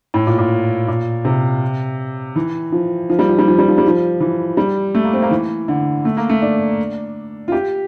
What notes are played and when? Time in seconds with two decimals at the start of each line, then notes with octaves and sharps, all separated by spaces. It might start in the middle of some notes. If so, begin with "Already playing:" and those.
0.14 A2
0.27 A#2
0.38 A#2
0.88 A#2
1.25 C3
2.36 E3
2.72 F3
3.10 F3
3.19 G3
3.29 F3
3.39 G3
3.48 F3
3.58 G3
3.68 F3
3.78 G3
3.88 F3
4.20 E3
4.57 G3
4.95 A3
5.04 A#3
5.13 C4
5.22 A#3
5.31 E3
5.68 D3
6.05 A3
6.17 A#3
6.29 A3
6.42 D4
7.48 F4
7.52 G4